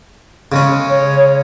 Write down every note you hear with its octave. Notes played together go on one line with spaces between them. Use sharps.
C#3 G#3 C#4
C#5